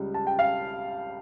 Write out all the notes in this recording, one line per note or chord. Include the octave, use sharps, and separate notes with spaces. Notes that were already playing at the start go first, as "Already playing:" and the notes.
Already playing: C#2 C#3 G3
A5
G5
F5